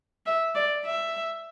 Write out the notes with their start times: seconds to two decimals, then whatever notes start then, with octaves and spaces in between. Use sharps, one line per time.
0.26 E5
0.55 D5
0.85 E5